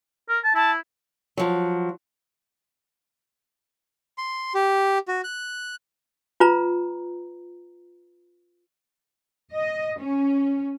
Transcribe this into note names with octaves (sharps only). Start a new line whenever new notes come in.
A#4
A5
E4 A5
F3 F#3
C6
G4
F#4
F#6
F4 B4 A#5
D#5
C#4